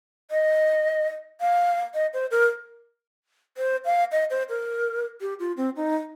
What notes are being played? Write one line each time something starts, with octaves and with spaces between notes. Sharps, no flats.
D#5
F5
D#5
C5
A#4
C5
F5
D#5
C5
A#4
G4
F4
C4
D#4